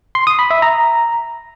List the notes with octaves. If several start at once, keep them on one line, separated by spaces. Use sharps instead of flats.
C6
D#6
B5
E5
A#5